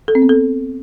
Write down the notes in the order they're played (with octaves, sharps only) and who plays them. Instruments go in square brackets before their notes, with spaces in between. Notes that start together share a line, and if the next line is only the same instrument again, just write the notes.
[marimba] A4
C4
B3
A4